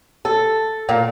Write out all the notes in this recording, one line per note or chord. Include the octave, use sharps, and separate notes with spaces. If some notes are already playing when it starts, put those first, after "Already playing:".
A4
A#2